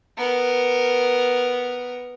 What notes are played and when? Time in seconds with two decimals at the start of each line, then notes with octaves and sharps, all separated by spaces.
0.18 B3 A#4